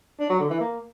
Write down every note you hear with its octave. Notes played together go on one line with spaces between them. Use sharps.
D4
F#3
D3
E3
A#3